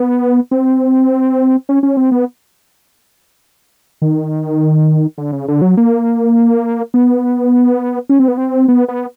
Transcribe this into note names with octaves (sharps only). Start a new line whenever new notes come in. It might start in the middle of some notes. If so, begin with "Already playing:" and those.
Already playing: B3
C4
C#4
C#4
C4
B3
D#3
D3
C#3
D3
F#3
A#3
B3
C#4
C4
B3
C4
B3
B3